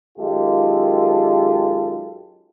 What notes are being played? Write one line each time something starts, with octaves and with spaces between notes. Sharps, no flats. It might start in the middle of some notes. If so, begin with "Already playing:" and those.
F#2 D#3 G#3 F4 G4 A4